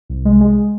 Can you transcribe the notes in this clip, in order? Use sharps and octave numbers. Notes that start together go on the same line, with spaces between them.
C2
G#3
G#3